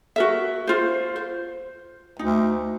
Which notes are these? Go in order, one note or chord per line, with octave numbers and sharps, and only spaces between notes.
F#4 A#4 E5
F4 C5
C5
D2 D#4